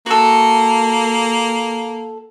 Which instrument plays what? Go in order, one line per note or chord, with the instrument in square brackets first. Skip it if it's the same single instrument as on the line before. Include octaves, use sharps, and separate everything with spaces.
[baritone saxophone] A#3 [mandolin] F#4 A4